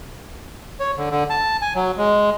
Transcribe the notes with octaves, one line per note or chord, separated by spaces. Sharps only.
C#5
D3
D3
A5
G#5
F#3
G#3